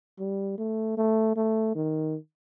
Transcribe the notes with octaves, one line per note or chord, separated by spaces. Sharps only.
G3
A3
A3
A3
D#3